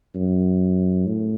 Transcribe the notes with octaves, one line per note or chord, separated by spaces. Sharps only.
F#2
A2